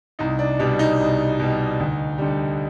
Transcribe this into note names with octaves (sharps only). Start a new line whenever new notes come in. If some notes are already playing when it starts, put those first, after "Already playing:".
C2 D#4
D4
B2 G3 D4
D#4
C2
B2 G3
D2
D3 G3